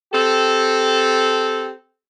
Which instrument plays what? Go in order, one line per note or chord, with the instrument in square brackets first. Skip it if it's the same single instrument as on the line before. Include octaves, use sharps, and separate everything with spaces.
[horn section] C4 G4 A4